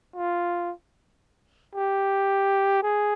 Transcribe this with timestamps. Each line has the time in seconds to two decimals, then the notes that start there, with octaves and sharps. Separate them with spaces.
0.16 F4
1.75 G4
2.83 G#4